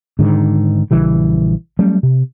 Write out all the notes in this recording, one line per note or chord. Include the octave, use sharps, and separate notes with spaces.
G#2 D3 D#3
A#1 C#3 E3 G3
F#3 G3 A3 C#4
C3